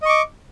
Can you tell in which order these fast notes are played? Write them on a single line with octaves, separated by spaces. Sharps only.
D#5 C#6 D6